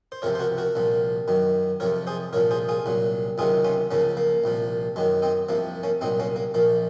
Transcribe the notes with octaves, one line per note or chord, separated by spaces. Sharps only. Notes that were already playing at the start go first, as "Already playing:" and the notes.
C5
C#2 C3 F3 A#4 C#5
C5
F#4 A#4
F#4 A#4
C2 A#2 F3
F#2 D#3 F#3
F2 C3 F3 A#4 C#5
G#4 C5
C2 A#2 F3 A#4 C#5
G#4 C5
F4 G#4
C2 A#2 F#3
C#2 C3 D#3 F#3 F4 G#4
C#4 F4
C#2 C#3 F3 A#3 C#4
A#3
C2 A#2 F3
F#2 D#3 F#3 G#3
C4 D#4
C2 C3 F3 A#3
A#3 C#4
C2 A#2 F#3 C4 D#4
A#3 C#4
A#3
A#1 A#2 F3 A#3